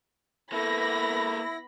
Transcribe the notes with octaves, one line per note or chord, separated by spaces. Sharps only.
A#3 B3 E4 A4 B5 A#6